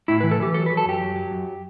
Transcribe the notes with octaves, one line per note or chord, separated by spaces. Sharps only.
A2 E4
E3 B4
A4
E3 G4
F#3 A4
B4
F#3
A4
F#2 G4
F#3
F#3
F#2